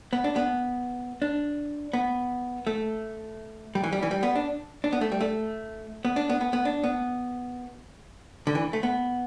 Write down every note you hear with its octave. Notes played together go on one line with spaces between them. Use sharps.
B3
D4
B3
D4
B3
A3
G3
E3
G3
E3
G3
B3
D4
D4
B3
A3
G3
A3
B3
D4
B3
B3
B3
D4
B3
D3
E3
A3
B3